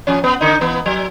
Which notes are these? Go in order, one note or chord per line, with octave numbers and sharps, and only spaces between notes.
F3 C#4
B3
D3 D#4
E3 B3
F#3